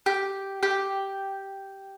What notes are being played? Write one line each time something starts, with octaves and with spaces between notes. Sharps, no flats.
G4
G4